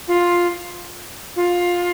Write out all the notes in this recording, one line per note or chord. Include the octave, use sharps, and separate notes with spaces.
F4
F4